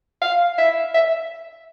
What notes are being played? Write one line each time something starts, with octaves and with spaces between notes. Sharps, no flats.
F5
E5
E5